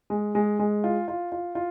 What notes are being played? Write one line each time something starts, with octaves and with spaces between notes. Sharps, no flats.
G#3
G#3
G#3
F4
F4
F4
F4